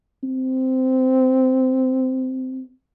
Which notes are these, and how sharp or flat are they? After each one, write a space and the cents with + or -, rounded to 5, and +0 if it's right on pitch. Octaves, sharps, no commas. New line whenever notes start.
C4 -10